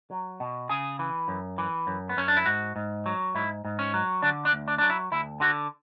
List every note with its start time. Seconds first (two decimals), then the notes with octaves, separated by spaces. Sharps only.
0.11 F#3
0.40 B2
0.69 C#3 G#4
0.99 E3
1.28 F#2
1.58 E3
1.87 F#2
2.09 B3
2.17 F#2 C#4
2.28 D4
2.37 E4
2.46 G#2 F#4
2.76 G#2
3.06 F#3
3.35 G#2 E4
3.65 G#2
3.79 C#4
3.94 F#3
4.22 D3 D4
4.45 D4
4.52 D2
4.68 D4
4.78 F#3 D4
4.90 E4
5.12 D2 E4
5.40 D3 F#4